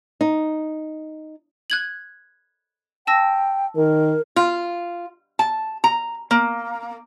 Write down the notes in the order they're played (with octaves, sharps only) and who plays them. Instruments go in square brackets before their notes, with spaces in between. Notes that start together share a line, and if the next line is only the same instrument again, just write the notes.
[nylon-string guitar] D#4
[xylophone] F#6 G#6 F#7
[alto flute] G5 [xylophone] A5 E6 A#6
[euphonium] D#3 [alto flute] A#4
[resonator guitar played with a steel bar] F4
A5
A#5
A#3